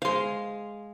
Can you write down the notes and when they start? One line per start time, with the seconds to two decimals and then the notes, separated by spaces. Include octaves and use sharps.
0.02 G#3 C5 F5 C6